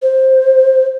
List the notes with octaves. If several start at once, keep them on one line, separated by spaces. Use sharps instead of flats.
C5